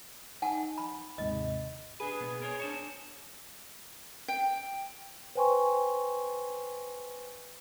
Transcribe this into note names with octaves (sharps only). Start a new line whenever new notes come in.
D#4 F#5 G#5 A5
B5
D#2 G#2 C3 D#5
D4 G#4 B4
B2 B3
A#4 C5 C#5
D4 C5 C#5
G5
B4 C5 G5 G#5 C6 C#6